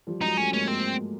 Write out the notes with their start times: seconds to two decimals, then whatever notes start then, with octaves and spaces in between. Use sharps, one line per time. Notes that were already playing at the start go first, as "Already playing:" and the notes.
0.07 F3 G3
0.21 F#3 G#3 D#4
0.37 G3 A3 C#4
0.53 G#3 A#3 C#4
0.67 G#3 A#3 C4